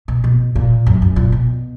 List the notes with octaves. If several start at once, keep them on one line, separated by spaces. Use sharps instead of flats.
B2
B2
A#2
F#2
F#2
A#2
B2